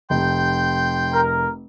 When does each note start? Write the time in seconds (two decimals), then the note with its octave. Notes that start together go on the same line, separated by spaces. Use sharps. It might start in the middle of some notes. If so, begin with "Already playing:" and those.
0.10 F1 G5 C6 G6
1.13 A#4